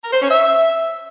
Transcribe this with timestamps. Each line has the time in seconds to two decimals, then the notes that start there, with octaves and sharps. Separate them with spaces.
0.04 A#4
0.13 C5
0.22 C#4
0.31 E5